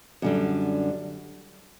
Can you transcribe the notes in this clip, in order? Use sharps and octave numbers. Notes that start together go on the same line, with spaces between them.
F#2 D3 G3